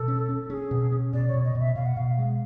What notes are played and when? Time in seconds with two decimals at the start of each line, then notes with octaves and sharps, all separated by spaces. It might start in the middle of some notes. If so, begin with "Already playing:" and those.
Already playing: B2 A4
0.08 C#4
0.29 C#4
0.50 C#4 G#4
0.71 B2
0.92 C#4
1.13 B2 D5
1.28 C#5
1.34 B2
1.44 D#5
1.55 B2
1.60 E5
1.75 B2 F5
1.86 F#5
1.97 B2 F5
2.18 G#3